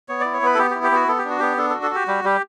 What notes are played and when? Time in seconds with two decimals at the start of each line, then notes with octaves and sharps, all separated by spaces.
0.09 B3 C#5
0.21 E4 D5
0.33 C#5
0.42 B3 B4
0.55 A4
0.58 B3 G4
0.71 G4
0.75 E4
0.83 G4
0.91 B3 F#4
1.08 B3 A4
1.18 G4
1.25 D4 F#4
1.39 B3 G4
1.57 D4 A4
1.70 A4
1.74 F#4
1.83 A4
1.91 F#4 G4
2.07 G3 G4
2.24 G3 G4